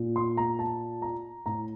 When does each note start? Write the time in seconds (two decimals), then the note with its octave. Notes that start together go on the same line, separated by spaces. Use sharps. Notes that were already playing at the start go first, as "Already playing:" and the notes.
Already playing: A#2
0.16 C6
0.37 A#5
0.59 A5
1.02 A#5
1.46 A2 A#5